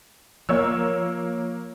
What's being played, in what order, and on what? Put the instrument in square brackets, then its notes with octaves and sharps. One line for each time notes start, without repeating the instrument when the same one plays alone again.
[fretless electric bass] F3 [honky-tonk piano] A#3 C#5 E6